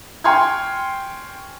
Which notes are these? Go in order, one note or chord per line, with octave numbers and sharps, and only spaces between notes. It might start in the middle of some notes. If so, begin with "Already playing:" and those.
G5 G#5 C6 C#6 F6 G#6